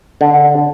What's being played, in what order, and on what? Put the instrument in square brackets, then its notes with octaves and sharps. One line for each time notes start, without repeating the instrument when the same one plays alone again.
[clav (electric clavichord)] D3